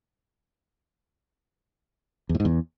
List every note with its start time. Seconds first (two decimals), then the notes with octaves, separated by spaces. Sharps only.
2.29 E2
2.35 A2
2.40 G#2
2.45 E2